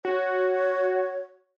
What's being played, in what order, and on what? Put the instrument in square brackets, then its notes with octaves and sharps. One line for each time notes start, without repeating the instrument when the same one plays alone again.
[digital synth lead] F#4 [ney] C#5